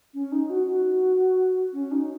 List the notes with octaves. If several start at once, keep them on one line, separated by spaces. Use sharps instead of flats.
C#4
D#4
F#4
F#4
C#4
D#4